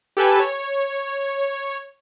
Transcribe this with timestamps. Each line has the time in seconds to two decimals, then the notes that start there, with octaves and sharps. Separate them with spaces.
0.17 G4 A4 B4 G#5 A5
0.40 C#5